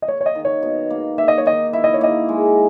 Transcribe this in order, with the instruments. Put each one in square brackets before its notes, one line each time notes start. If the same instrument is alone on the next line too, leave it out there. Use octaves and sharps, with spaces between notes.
[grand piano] D#5
[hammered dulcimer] A#3 [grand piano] C#5
[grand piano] C#5
D#5
[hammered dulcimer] D#3
[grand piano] C#5
[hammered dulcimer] B2
A#3
[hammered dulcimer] A#3 [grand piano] E5
[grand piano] D#5
C#5
[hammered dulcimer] D#3 [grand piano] D#5
[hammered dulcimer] E4 [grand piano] E5
[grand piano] D#5
C#5
[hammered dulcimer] A#3 [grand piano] D#5
[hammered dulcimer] G#3